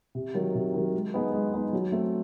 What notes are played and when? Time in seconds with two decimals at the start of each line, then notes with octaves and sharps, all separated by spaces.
0.15 C3
0.34 D#3 F#3
0.55 C3
0.74 D#3 F#3
0.94 G#3
1.14 B3 D#4 G#4 B4
1.34 G#3
1.53 B3 D#4 G#4 B4
1.73 F#3
1.92 A3 C4